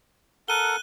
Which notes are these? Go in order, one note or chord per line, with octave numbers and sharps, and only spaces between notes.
A4 A#4 F#5 F#6 D#7 G7